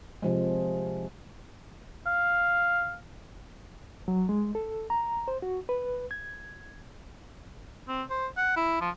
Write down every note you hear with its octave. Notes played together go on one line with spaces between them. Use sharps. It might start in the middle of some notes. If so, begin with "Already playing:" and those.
C3 F3 G#3
F5
F#3
G#3
A4
A#5
C5
F#4
B4
G#6
C4
C5
F#5
E4
F3